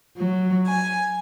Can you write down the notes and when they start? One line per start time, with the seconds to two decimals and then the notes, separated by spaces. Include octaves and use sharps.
0.17 F#3
0.67 G#5